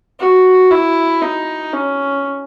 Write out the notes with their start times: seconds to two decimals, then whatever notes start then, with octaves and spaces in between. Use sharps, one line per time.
0.20 F#4
0.71 E4
1.22 D#4
1.73 C#4